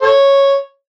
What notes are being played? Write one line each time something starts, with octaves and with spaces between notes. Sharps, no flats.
A4 C#5